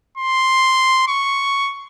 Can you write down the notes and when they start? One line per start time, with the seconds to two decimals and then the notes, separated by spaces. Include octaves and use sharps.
0.18 C6
1.08 C#6